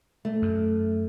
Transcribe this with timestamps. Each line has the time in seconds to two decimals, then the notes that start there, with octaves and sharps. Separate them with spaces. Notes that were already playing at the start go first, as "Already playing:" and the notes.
0.25 A3
0.42 F#2